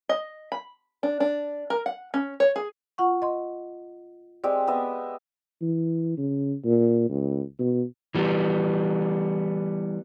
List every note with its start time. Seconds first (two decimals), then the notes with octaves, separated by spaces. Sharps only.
0.09 D#5
0.52 B5
1.03 D4
1.20 D4
1.70 A#4
1.86 F#5
2.14 C#4
2.40 C#5
2.56 G#4
2.98 F4 F#5 C#6
3.22 D#5 C6
4.44 G#3 C4 G4 D5
4.67 B3 D#5 E5
5.62 E3
6.18 C#3
6.65 A#2
7.09 C#2
7.59 B2
8.15 E3 G3 B3